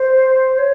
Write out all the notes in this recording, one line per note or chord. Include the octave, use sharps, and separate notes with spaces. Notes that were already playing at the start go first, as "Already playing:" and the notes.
Already playing: C5
C#5